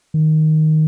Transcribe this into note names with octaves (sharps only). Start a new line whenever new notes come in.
D#3